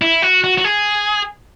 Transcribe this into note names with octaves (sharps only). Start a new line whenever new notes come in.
E4
F#4
F#4
F#4
G#4